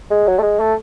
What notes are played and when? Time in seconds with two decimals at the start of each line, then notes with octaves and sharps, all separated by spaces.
0.11 G#3
0.27 F#3
0.38 A3
0.42 G#3
0.60 A3